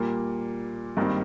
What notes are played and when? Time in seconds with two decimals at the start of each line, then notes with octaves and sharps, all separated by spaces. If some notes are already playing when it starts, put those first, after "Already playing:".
Already playing: A#2 G3 A#3
0.97 G#1 G2 D#3 G3 A#3